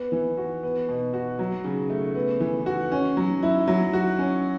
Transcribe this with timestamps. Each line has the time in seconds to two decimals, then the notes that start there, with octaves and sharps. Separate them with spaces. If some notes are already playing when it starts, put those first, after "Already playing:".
Already playing: B3
0.12 E3
0.37 F#4
0.63 B3
0.89 B2
1.14 F#4
1.39 F#3
1.64 C#3
1.90 A3
2.15 B3
2.40 E3
2.66 F#4
2.92 C#4
3.17 F#3
3.43 E4
3.68 F#3
3.93 F#4
4.19 C#4